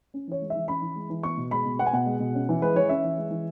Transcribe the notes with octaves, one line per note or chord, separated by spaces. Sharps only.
C#4
E3 C#5
G#3
E3 E5
C#4 B5
E3
G#3
E3
B3 C#6
B2
G#3 B5
B2
B3 F#5
G#5
B2 F#5
G#3
B2
C#4
E3
G#3 B4
E3 C#5
C#4 E5
E3
G#3
E3